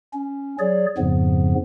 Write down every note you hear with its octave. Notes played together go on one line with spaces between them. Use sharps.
C#4
F#3 G#4 C#5 D5
F2 G#2 C#3 F3 B3